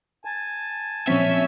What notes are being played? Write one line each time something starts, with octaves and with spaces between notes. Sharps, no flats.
G#5 A5
A#2 F3 C4 C#4 E5